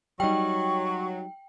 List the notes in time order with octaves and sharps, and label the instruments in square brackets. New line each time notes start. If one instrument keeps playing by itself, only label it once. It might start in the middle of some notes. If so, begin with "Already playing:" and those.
[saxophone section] F#3 [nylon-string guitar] G3 D#4 [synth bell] G5 [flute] C#6